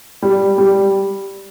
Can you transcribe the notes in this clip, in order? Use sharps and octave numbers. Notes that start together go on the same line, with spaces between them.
G3
G3